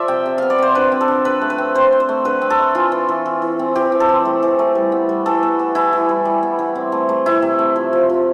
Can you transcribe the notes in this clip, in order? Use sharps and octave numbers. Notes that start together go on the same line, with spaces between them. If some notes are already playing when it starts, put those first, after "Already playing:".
Already playing: F3 D5 E5
C3 G5
C3
B3 F5
D5
C3 C5
D3 B4
C4
A4
D3
D3 B4
A3
B4
C4
C4 C5
C4
C5
A3
D3 B4
C4
A4
A3
E3 F4
E3
E3
E3
E3
C4
E3 G4
C4
A4
C4
A3
E3
A3
G3
B3
G3
E3 A4
B3
E3
E3 E4
E3
G3
G3
B3
E3
C4
A3
A3
C3 E4
C3
A3
F3
F3
F3